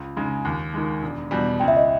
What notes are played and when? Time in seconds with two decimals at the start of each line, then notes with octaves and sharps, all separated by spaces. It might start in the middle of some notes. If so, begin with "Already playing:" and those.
Already playing: C#2
0.17 C#3 G#3 D#4
0.45 D#2
0.74 D#3 G#3
1.02 E1
1.31 E2 B2 G3
1.60 C#2 G5
1.68 E5
1.77 D#5